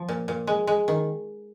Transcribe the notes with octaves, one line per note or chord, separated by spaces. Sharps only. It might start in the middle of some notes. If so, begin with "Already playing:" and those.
Already playing: F3
A#2
A#2
G#3
G#3
D#3